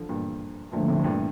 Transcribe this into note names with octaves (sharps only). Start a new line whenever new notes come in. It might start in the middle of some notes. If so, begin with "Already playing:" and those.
Already playing: D3 F3
G2 A#2
G2 A#2 D3 F3 A3 D4
A2 C3
A2
G2 A#2